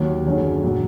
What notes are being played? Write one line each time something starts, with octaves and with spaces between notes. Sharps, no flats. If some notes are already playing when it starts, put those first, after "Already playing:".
Already playing: D#2 D#3 F#3
F#1 F#2 D3 F#3
A#2 F#3 A#3